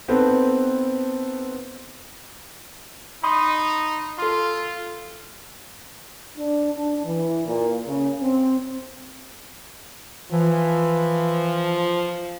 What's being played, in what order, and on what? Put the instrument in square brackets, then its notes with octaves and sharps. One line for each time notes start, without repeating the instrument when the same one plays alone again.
[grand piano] B3 C4 D#4 A4 B4
[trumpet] D#4 [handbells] B5 C6 D#6
[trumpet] F4 [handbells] A4 C6
[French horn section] D4
D4
E3
A#2
C#3
C4
[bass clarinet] E3 [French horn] F3